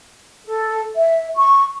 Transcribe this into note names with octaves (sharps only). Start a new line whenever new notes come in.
A4
E5
C#6